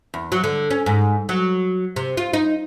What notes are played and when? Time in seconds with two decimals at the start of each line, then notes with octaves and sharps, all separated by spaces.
0.14 E2
0.32 F#3
0.44 D3
0.71 C#4
0.86 G#2
1.29 F#3
1.96 C3
2.17 F4
2.34 D#4